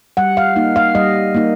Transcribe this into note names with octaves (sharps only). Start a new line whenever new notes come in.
G3 F#5
F5
A#3 D#4
F5
G3 D#5
A#3 D#4